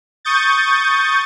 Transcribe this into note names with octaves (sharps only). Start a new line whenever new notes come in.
C#6 D#6 G6 A6